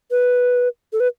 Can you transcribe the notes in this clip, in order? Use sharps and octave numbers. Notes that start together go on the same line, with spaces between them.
B4
A4
B4